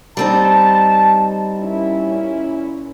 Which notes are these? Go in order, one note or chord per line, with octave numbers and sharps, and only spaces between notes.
G3 C4 D#4 A5
A#2 C#4 E4